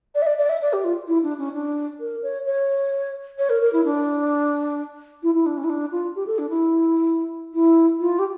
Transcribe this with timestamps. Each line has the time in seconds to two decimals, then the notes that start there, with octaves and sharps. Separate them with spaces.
0.15 D5
0.22 E5
0.26 D5
0.38 D5
0.49 E5
0.61 D5
0.73 G4
0.84 F4
1.07 E4
1.23 D4
1.38 C#4
1.53 D4
2.00 A#4
2.22 C#5
2.45 C#5
3.38 C#5
3.49 A#4
3.61 A#4
3.73 E4
3.84 D4
5.23 E4
5.34 E4
5.46 D4
5.57 C#4
5.64 E4
5.70 D4
5.92 F4
6.15 G4
6.27 A4
6.38 D4
6.50 E4
7.54 E4
8.00 F4
8.19 G4